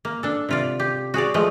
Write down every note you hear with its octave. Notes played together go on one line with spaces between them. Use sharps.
A#3
D4 A4
C3 F4 D5
G4
F#4 G#4 C#5 D5
F3 G#3 A3